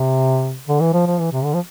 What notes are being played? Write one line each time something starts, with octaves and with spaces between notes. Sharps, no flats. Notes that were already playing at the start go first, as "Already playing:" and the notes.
Already playing: C3
D3
E3
F3
F3
E3
C3
D3
F3